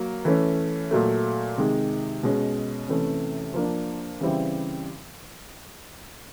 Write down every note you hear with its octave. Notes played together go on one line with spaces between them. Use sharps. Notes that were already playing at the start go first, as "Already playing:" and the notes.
Already playing: F#3 A#3
E3 A3 C#4
A#2 F#3 A3
C3 D#3 G#3
B2 G#3 C#4
C3 E3 A3 C#4
F3 A#3 D4
C#3 E3 G3 C4 E4